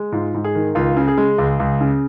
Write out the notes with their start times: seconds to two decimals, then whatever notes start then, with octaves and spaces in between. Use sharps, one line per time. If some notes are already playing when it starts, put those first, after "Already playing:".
Already playing: G#3
0.12 G#2 F4
0.34 G#2
0.44 G#4
0.55 D#3
0.75 C#2 F4
0.97 C#3
1.08 G#4
1.18 G#3
1.38 C#2
1.60 C#2
1.81 C#3